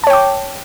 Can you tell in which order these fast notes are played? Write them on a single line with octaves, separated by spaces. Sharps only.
A5 C#5 G5 D6